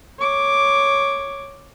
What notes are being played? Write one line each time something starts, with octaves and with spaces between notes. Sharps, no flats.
C#5 D6